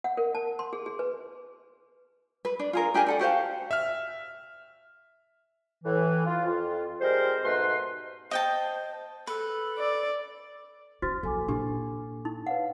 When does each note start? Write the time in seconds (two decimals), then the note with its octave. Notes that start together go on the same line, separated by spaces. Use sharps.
0.04 F#5
0.17 A#4
0.35 A5
0.59 C6
0.73 G#4
0.86 G#4
0.99 B4
2.45 B4
2.59 D4
2.73 F4 G#4 A#4
2.94 D4 G4 A#4 G#5
3.06 D4 A4 F#5
3.19 F#4 G4 C5 F5
3.71 E5 F6
5.84 A2 E3
6.26 F4
6.45 F2 F4
7.01 G3 G#3 C4 A#4 C5
7.44 G#2 B2 A3 B4 C6
8.31 C5 D#5 G5 A5
9.27 A4 B4
9.78 D5
11.02 C#4 F#4 C5 F6 A6
11.23 A#1 A4 G#5 D6
11.48 A#2 D4 G4
12.25 D#4
12.47 B4 C#5 F5 F#5